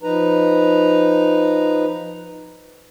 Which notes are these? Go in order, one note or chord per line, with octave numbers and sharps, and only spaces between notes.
F3 D#4 B4 A#5